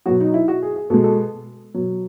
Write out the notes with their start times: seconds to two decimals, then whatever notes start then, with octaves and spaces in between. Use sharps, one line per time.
0.06 B2 F#3 F#4
0.20 D#4
0.34 E4
0.48 F#4
0.62 G#4
0.76 G#4
0.90 B2 G#3 A4
1.04 A4
1.74 B2 F#3